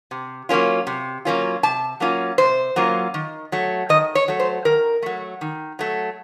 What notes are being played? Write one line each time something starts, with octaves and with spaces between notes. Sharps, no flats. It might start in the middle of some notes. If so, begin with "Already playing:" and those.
C3
F#3 A#3 C#4 F4
C3
F#3 A#3 C#4 F4
C3 A5
F#3 A#3 C#4 F4
C3 C5
F#3 A#3 C#4 F4
D#3
F#3 A3
D#3 D#5
C#5
F#3 A3
C5
D#3 A#4
F#3 A3
D#3
F#3 A3